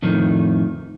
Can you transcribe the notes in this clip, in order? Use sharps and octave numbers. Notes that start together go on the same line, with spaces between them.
F2 A2 D#3